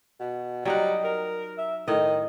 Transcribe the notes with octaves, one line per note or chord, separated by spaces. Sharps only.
B2
F#3 G3 D#4 F#5
A#4
E5
A2 D#3 D#5